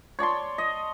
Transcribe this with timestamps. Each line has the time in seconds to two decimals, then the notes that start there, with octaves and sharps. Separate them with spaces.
0.19 C#5 D5 A5 C6
0.58 D#5